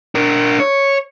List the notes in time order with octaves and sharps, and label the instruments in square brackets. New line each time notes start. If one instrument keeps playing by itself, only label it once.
[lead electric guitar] D4 A#4
C#5